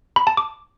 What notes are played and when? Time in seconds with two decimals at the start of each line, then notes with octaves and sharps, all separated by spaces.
0.16 B5
0.27 A5
0.37 D6